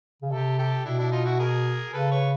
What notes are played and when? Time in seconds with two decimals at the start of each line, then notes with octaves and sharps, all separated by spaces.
0.22 C#3
0.31 C3 G4 A4
0.58 G4 A4
0.85 B2 D4 E4
0.99 D4 E4
1.12 D#4 F4
1.25 E4 F#4
1.40 G#4 A#4
1.93 C#3 A4 B4
2.11 B4 C#5